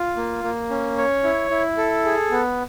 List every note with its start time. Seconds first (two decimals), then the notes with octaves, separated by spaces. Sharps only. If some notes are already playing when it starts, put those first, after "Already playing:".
Already playing: F4
0.17 A#3
0.44 A#3
0.70 C#4
0.98 C#5
1.23 E4
1.50 E4
1.77 A4
2.05 G#4
2.31 B3